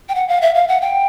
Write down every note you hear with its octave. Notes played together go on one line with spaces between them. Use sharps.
G5
F#5
F5
E5
F5
F#5
G5